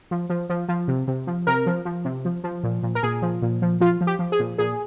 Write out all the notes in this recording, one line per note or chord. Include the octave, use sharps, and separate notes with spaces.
F3
F3
F3
F3
C3
C3
F3
C3 A#4
F3
F3
C3
F3
F3
A#2
A#2
A#4
A#2 G#4
F3
A#2
F3
F3 F4
F3
G4
F3
G#4
A#2
A#2 G#4